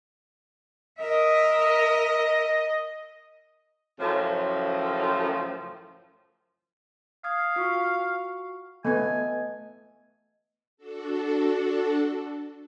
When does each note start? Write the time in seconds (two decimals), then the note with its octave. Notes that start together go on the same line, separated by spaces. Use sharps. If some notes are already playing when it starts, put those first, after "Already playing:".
0.99 A#4 D#5 E5
4.00 F#2 A2 C#3 F3
7.24 F5 D#6 G#6 C7
7.56 F4 F#4 C#6
8.85 A3 B3 D#5 G#5
10.77 D4 F#4 A4